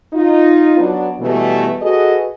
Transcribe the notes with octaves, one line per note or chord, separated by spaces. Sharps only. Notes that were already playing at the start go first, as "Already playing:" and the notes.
D#4 F4
F#3 B3 D4
B2 E3 G3 A3
F#4 G#4 A4 B4 D#5